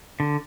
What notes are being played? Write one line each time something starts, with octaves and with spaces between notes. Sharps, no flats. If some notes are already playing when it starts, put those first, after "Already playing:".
D3